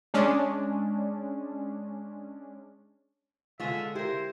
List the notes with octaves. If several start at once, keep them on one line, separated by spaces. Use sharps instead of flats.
G#3 C#4 D4
D3 G#3 A3 F4 G#4 E5
E4 G4 A#4 C5